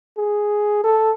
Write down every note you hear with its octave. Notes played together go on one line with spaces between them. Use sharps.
G#4
A4